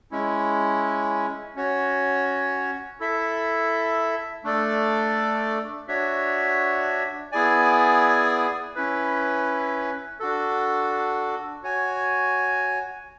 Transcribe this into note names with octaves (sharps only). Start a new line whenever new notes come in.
G#3 C#4 E4
C#4 F#4 C#5
E4 A4 E5
A3 D4 A4 D5
D4 F#4 C#5 E5
B3 E4 G#4 D5 G#5
C#4 E4 B4
D4 F#4 A4
F#4 C#5 G#5